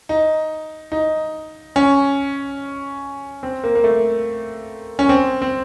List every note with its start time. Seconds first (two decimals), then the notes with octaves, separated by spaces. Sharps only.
0.09 D#4
0.92 D#4
1.76 C#4
3.43 C4
3.64 A#3
3.75 A#3
3.84 A3
4.99 C#4
5.09 C4
5.42 C4